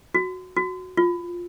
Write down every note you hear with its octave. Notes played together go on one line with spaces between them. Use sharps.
F#4
F#4
F4